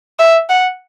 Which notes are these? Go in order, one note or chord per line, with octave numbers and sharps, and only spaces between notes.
E5
F#5